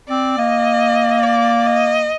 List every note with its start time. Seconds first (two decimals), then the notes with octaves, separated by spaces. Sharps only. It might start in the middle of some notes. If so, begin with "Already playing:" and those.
0.09 C4 D5
0.38 A#3 D#5
1.23 D5
1.66 D#5